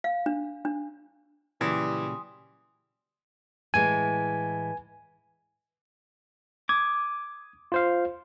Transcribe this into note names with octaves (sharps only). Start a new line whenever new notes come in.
F5
D4
D4
A#2 C#3 E3 F#3 G3 G#5 C6 D#6
A2 E3 G#3 G#5
D6 D#6 G#6
F4 C5 F5